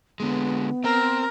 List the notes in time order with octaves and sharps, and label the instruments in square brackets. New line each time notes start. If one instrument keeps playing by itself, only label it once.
[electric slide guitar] D3 G#3 [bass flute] B3
[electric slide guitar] C4 [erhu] A#4